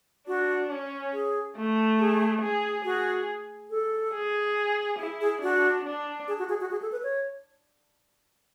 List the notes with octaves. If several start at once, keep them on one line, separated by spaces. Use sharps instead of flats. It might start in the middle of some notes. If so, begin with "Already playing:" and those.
D4 F#4
C#4
G#4
A3
G#4
G#4
F#4 G#4
A4
G#4
E4 G#4
G#4
D4 F#4
D4
G#4
F#4
G#4
F#4
G#4
A4
B4
C#5